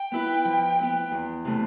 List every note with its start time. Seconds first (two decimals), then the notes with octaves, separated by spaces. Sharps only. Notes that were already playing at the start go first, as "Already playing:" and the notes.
Already playing: G5
0.12 B3 E4 B4
0.45 F3
0.78 B3 E4 B4
1.11 E2
1.45 C3 E3 A3